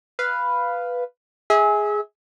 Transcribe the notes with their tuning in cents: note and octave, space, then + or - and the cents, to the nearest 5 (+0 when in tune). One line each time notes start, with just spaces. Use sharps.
B4 +0 F5 -5
G#4 +0 E5 -35